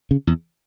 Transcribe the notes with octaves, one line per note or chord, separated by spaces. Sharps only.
C#3
E2